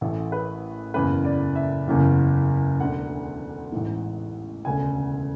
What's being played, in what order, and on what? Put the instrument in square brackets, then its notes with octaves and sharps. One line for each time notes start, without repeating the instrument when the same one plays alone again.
[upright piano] A1 A2 E3 A4
B4
F#1 E2 C#3 E3 B4
D5
E5
F#1 E2 C#3 E3
E1 D2 D3 F#5
A1 G#2 E3
E1 D2 C#3 G#5